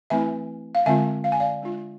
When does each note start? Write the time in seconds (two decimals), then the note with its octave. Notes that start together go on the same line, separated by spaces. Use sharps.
0.10 E3 A3 C4 E4 E5 G#5
0.75 F5
0.86 D3 G#3 C4 F4 E5 G#5
1.24 F5
1.32 G#5
1.40 D5 F5
1.62 G#3 D4 F4